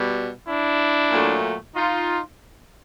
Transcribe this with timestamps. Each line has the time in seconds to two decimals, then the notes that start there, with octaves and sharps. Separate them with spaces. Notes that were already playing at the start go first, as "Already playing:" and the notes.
Already playing: B2 G3
0.48 D4 E4
1.11 A#2 F#3 A3
1.75 D#4 F4